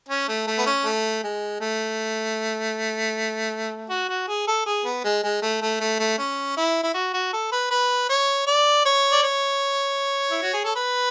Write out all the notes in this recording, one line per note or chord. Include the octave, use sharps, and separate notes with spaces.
C#4
A3
A3
B3
C#4
A3
G#3
A3
F#4
F#4
G#4
A4
G#4
B3
G#3
G#3
A3
A3
A3
A3
C#4
E4
E4
F#4
F#4
A4
B4
B4
C#5
D5
C#5
D5
C#5
E4
F#4
G#4
A4
B4